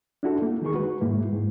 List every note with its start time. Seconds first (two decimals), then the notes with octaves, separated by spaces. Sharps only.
0.23 D4 E4 F#4 A4
0.42 A#3
0.62 D#3 G#3 D#4 G#4 A#4 C#6
0.74 F#4 B4
1.01 G#2 G#3 A#3 E4
1.32 G#2